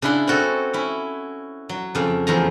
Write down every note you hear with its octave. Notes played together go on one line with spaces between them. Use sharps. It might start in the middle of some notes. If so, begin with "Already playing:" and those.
C#3 D4 E4 F#5 C6
C4 C#4 F#4 A4
C#4 E4
F#3
F2 C#3
E2 F3 A3 A#5